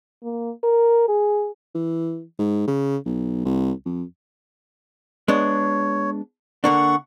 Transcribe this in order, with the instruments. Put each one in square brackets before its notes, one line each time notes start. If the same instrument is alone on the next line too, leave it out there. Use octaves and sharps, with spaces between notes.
[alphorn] A#3
A#4
G#4
[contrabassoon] E3
G#2
C#3
B1
C2
F2
[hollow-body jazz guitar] G#3 B3 D4 [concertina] C#5
[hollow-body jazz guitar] D3 A#3 D4 [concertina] F#5 C#6